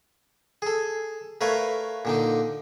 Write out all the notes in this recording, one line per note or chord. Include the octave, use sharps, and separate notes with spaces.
G#4 A4
A3 A#4 B4 C#5 F5
A#2 D3 D#4